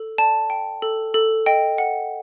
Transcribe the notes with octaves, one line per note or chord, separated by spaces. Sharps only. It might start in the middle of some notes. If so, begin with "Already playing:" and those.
Already playing: A4
D5 A5
G5
A4
A4
D#5 G5
F#5